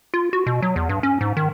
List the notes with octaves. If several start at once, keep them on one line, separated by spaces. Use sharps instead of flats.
F4
F#4
B2
F#3
E2
G2
C#4
G#2
D#3